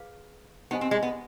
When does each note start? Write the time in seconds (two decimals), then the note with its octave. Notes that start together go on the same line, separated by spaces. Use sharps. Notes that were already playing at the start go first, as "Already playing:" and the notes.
Already playing: G#4 B4 F5
0.71 B3 D#4 G4 C5 D#5 G#5
0.81 C4
0.91 G#3
1.03 B3